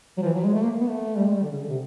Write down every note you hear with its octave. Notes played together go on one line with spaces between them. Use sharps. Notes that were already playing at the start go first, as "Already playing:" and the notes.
F#3
F3
E3
F#3
G#3
A3
A#3
B3
A3
G3
G#3
G3
D3
C#3
D3
C3